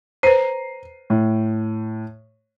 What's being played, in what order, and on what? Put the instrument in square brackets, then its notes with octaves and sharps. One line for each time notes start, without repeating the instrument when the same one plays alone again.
[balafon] B4 C5 [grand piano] A#5 C7 D#7
[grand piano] A2